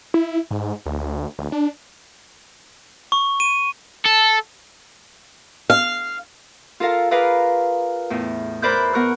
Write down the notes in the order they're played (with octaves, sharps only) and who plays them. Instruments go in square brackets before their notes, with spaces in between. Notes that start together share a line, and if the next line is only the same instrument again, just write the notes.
[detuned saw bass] E4
G#2
D2
D2
D4
[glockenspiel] C#6
D#7
[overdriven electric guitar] A4
[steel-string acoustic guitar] F5
[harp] F4 A4 A#4 F5
G#4 A#4 B4 D5 F5
E2 A2
A#4 C5 D5 B5 F#6 G6
B3 A#4 C#6 F#6